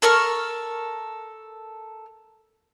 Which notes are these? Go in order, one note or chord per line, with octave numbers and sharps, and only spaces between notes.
A4 A#4 C#6 F6